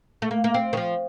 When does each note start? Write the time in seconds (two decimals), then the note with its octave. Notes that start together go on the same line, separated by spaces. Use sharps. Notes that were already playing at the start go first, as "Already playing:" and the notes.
0.22 A3
0.31 A#3
0.44 A#3
0.54 C4
0.73 D#3
0.77 F3